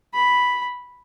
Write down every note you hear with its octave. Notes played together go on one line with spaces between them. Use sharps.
B5